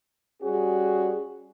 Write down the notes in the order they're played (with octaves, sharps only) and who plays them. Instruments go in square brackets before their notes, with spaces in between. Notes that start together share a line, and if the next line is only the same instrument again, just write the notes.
[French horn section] G3 C#4 F#4 G#4